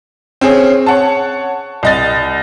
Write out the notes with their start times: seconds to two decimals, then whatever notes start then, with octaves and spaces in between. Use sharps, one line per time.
0.41 C4 C#4 G#4
0.86 C#5 F#5 A5
1.83 C2 D#5 A6